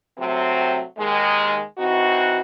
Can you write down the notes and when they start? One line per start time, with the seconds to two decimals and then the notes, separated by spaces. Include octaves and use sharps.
0.18 C3 F#3 A3 C4
0.98 D#2 D#3 G#3
1.78 E3 C4 D#4 F#4